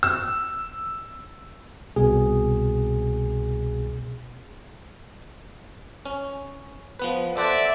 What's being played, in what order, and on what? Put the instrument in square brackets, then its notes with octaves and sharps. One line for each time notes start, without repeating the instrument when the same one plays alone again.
[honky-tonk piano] E6
[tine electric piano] C2 B2 G#4
[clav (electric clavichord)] C#4
F3 B3 B4
[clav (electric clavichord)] A4 C5 F#5 [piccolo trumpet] D5 [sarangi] E5